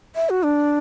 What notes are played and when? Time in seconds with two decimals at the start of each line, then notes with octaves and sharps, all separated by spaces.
0.15 E5
0.30 F#4
0.44 D4